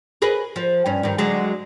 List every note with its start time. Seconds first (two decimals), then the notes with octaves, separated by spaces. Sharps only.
0.22 G#4 A#4 B4
0.56 F3
0.86 G2 C#4
1.03 G2 D#3
1.18 D3 F#3 G#3